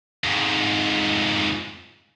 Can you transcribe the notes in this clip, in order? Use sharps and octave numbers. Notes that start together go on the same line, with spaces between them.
F2 G#2